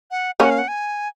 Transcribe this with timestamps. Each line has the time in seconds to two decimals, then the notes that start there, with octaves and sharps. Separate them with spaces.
0.11 F#5
0.40 A#3 C#4 F#5
0.50 F5
0.58 F#5
0.68 G#5